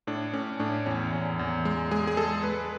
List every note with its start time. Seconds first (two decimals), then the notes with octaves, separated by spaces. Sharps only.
0.07 A2 D4
0.34 A2 C#4
0.60 A2 D4
0.86 E2 C#4
1.13 E2
1.39 E2
1.65 G#3
1.91 G#3 G#4
2.07 G#4
2.17 G#3 A4
2.43 G#3 B4